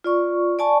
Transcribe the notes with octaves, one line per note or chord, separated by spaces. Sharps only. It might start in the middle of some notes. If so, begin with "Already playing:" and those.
F4 D5 C#6
D5 G#5 A5 C#6